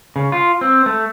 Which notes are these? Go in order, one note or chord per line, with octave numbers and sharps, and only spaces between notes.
C#3
F4
C4
A3